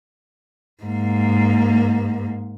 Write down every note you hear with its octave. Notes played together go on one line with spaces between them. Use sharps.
G#2 A#3